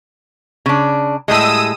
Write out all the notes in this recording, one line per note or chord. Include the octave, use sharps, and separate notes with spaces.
C#3 D4
A2 G3 G#3 D#6 E6 D#7